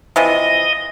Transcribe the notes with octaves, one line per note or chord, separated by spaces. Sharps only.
C3 E3 F3 D#5